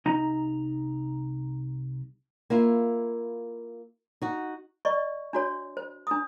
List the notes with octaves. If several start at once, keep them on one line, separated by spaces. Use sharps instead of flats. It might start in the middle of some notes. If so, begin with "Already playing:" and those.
C2 D#4 A#5
A#3 E4 F4
D#4 F#4
D5 D#5 C#6
D4 F#4 C#5
C5
D4 D#6